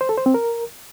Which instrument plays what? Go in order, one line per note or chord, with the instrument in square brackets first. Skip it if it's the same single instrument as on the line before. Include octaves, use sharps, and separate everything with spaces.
[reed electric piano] C5
A4
C5
C4
A#4